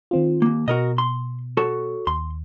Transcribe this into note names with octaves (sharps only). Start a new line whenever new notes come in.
D#3 C4 F4
D#2 A#3
B2 F#4 A#4 D#5
C6
F#4 A4 C#5
D#2 C6